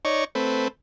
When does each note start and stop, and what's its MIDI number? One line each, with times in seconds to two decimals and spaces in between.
0.05 0.24 63
0.05 0.24 73
0.05 0.24 74
0.05 0.24 85
0.35 0.68 57
0.35 0.68 60
0.35 0.68 71